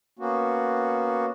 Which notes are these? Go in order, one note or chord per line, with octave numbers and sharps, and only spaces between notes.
A#3 B3 C#4 F#4